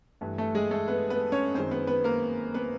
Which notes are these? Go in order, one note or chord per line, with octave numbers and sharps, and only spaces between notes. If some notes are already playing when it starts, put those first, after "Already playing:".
G2 E3 A3
A3 A4
G#3 G#4
A3 A4
B3 B4
B3 B4
C#4 C#5
F#2 D#3 G#3 C4 C5
B3 B4
B3 B4
A#3 A#4
B3 B4